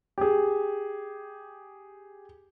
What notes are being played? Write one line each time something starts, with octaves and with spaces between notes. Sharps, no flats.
G4 G#4